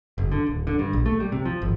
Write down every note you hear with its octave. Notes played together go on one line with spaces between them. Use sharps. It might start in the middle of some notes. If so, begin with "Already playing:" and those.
F#1
D3
D1
D3
G2
A#1
A3
G3
C3
F3
G#1